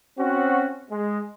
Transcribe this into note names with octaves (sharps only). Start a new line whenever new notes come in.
C4 C#4 F#4
G#3